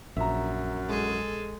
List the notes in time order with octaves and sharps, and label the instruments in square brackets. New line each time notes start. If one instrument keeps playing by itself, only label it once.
[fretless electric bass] A#1 [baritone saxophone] F#2 [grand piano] E5 A#5
[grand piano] G#3 [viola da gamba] G#4 A4